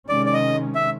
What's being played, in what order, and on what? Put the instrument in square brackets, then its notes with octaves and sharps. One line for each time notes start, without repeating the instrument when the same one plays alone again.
[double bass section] C3 D#3 G#3 C#4 [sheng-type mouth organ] D5
[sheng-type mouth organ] D5
D#5
E5